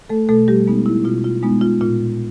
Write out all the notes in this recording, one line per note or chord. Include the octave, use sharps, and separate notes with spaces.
A3 A4
B2 A3 A4
G3 G4
G#3 B3 D#4
E4
B2 F4
F4
G#3 B3 D#4
F4
A#2 F4